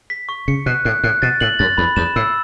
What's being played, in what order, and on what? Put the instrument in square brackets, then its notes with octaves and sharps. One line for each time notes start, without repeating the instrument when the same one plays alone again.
[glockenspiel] B6
C#6
[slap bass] C#3 [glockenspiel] C#7
[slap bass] B2 [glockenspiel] F#6
[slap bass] A2 [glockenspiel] F#6
[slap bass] A2 [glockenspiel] F#6
[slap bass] B2 [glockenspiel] A6
[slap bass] A2 [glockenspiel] F#7
[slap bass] F#2 [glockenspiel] A6
[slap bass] E2 [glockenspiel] B5
[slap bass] E2 [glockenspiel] E7
[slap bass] A2 [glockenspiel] E6